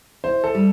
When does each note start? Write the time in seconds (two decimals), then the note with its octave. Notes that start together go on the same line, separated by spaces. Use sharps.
0.24 E4 C5
0.44 A4
0.54 G3